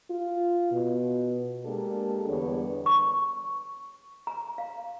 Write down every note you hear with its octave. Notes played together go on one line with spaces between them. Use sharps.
F4
B2
G#3 A#3 D4 G4 A4 A#4
E2 D3 G3 B3 D4 C#5
C#6
A#5
F5